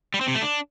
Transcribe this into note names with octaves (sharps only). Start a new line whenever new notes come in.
G3
C4
C3
A3
D4